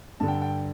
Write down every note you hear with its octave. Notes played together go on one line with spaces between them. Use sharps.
G2 D3 A5
G5
A5
G5